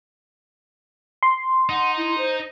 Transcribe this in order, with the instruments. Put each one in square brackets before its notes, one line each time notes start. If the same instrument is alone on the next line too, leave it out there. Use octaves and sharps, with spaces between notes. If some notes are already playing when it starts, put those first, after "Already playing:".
[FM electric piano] C6
[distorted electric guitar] D#4 [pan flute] F#5
[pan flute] E4
C5